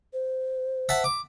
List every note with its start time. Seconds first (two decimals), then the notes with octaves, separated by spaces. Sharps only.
0.13 C5
0.89 E5 F#5 A5
1.04 D6